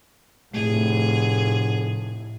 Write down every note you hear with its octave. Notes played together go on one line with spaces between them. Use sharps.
F1 A2 A3 G#4